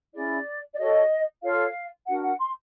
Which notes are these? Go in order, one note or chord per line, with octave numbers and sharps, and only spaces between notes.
C#4 E4 G#4 D5
D5
F#4 A4 C#5 D#5
F4 A4 C#5 F5
D4 F#4 A#4 F#5
F#5
C6